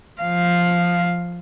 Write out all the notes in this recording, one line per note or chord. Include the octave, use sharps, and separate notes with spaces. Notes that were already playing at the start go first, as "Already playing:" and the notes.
F3 F5